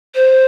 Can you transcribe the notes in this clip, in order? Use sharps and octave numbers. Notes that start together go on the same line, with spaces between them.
C5